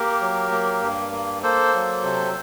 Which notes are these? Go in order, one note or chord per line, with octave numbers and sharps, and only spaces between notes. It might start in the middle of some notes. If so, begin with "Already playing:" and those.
Already playing: A#3 G4 A#4
F#3
A#3
G2
A#3
A#3 A4 C5
F#3
C3